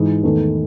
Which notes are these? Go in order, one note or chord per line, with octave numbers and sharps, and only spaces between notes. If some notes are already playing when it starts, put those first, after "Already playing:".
Already playing: G#2 E3 G#3 D#4
E2 D#3 A3